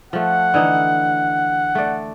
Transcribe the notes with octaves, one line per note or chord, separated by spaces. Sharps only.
F3 A3 F#5
D3 E3 D#4
A3 D5